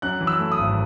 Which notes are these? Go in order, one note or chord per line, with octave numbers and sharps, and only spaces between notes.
F#2 F#6
E3
E6
A3
D#6
G#1